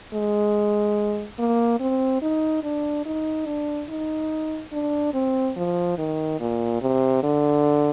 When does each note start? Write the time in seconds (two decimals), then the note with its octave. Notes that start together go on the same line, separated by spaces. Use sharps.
0.13 G#3
1.38 A#3
1.80 C4
2.22 D#4
2.63 D4
3.06 D#4
3.47 D4
3.89 D#4
4.73 D4
5.14 C4
5.57 F3
5.98 D#3
6.40 A#2
6.81 C3
7.23 D3